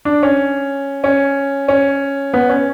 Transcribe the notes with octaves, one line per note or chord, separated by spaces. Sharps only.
D4
C#4
C#4
C#4
B3
C#4